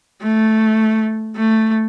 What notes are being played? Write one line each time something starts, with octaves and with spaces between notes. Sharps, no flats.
A3
A3